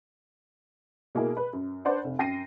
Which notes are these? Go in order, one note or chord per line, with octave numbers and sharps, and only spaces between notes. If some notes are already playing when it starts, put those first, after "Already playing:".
B2 A#3 E4 G#4
B4
F#2
D4 B4 C5 D5 F#5
F1
F#2 G5 A#6 C7 D#7